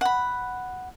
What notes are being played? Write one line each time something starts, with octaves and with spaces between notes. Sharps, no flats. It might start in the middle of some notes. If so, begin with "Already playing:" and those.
F#5 B5